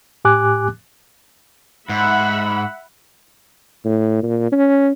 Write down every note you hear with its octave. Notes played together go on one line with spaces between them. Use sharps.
A2 G4 G#5 D6 F#6
G#2 E5 F#5 B5
A2
A#2
C#4